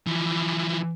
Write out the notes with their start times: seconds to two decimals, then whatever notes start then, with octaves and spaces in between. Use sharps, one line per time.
0.07 E3 F3